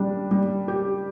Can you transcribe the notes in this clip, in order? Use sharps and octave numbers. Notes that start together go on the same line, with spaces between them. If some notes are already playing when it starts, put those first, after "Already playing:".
Already playing: G3 D4
G3
G4